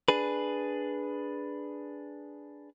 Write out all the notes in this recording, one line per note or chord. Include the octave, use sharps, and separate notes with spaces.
D4 G#4 B4